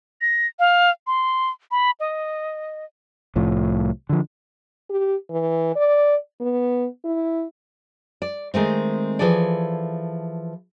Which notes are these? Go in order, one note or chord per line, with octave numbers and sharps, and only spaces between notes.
A#6
F5
C6
B5
D#5
C2 A2 F3
D3 F3
G4
E3
D5
B3
E4
D5
D#3 G#3 A3 C4
E3 F3 G#4 A4 D5